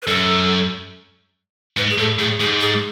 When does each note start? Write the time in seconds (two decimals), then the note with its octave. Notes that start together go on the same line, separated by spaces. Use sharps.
0.02 B4
0.07 F#2 A4
1.77 G#2 B4
1.90 G#4
1.98 A2 A4
2.19 A2 G#4
2.40 G#2 G#4
2.61 G#4